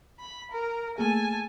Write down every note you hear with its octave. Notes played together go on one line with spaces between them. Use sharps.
B5
A#4
A3 A#3 G#4 G#5 A5